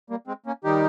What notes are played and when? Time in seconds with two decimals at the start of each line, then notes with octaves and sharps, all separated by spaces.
0.10 G3 A#3
0.27 G#3 C4
0.46 A#3 C#4
0.64 D#3 G3 D#4 G4